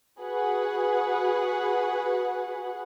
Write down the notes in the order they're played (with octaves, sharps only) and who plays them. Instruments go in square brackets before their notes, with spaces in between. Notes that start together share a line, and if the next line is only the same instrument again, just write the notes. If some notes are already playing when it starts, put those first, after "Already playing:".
[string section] F#4 G#4 B4 F#5